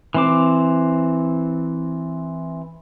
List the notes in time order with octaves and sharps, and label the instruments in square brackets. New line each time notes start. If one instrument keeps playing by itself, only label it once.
[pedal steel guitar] E3 C4 D6